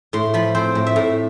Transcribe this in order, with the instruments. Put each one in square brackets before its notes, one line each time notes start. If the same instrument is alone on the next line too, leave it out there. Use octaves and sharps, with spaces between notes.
[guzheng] A2 C6
F3 B5
C4 C5
A2
E5
A2